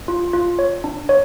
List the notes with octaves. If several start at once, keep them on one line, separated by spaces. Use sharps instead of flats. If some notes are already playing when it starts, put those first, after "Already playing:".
F4
F4
C#5
D4
C#5